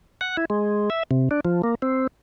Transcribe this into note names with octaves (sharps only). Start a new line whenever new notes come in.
F#5
E4
G#3
E5
C3
D4
F3
A#3
C4